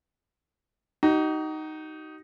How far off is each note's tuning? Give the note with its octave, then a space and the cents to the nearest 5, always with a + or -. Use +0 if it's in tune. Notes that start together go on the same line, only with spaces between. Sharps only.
D#4 +0 F#4 +45